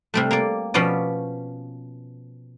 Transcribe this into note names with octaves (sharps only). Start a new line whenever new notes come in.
C3 G3 A3
A#3 D5
B2 F3 B3 C#4 D5